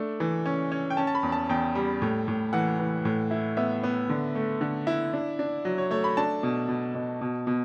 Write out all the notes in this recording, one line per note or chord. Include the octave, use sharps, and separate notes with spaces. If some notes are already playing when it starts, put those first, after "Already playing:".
Already playing: A3 D4
E3
C#4
C#4
G5
C#4 A5
A5
B5
E2
A5
E2 G5
G3
A2
A2
E3 F#5
E3
A2
E4
B3 E5
B3
D3
A3
D3
E4
D4
D4
F#3
C#5
A3 C#5
B5
D4 A5
B2
B2
B2
B2
B2